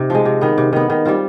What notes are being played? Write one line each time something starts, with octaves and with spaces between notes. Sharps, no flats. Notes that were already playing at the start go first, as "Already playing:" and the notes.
Already playing: C3 D#4
F3 G#3
C3
D#3 B3
C3
D#3 B3
D#3
G3 C4 F4